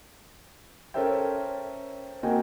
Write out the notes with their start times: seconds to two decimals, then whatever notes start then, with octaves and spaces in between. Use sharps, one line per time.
0.94 C#4 A4 A#4 C5 E5 G5
2.23 A#3 C4 F#4 D#5 G5 G#5